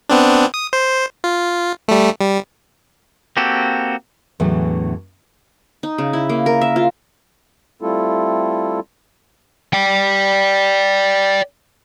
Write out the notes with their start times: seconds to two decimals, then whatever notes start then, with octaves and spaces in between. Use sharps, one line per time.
0.09 B3 C4 D4
0.54 D#6
0.73 C5
1.24 F4
1.88 G3 A3
2.21 G3
3.37 A#3 C4 F#4 G4 A4
4.40 E2 A2 D3 E3 F#3
5.83 D#4
5.98 C#3
6.13 E4
6.29 A#3
6.46 A#4
6.61 E5
6.76 F4
7.81 G3 A3 C4 E4 F4 A4
9.73 D5 G5